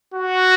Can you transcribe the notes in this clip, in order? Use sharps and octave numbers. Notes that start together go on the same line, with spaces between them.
F#4